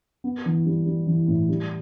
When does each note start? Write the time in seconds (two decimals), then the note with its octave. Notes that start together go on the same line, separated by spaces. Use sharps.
0.24 B3
0.46 E3
0.66 G3
0.86 G3
1.07 E3
1.28 A2
1.49 G3